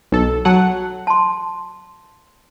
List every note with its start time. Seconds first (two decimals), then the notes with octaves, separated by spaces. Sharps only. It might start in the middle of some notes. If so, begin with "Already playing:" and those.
0.12 B1 A4
0.45 F#3 F#5 A5
1.07 A5 C6